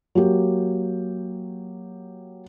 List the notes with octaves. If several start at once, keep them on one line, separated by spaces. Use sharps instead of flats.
F#3 A#3 G4